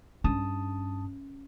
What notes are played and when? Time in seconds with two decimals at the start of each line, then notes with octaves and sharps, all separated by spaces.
0.24 G2 C#4 A5 D#6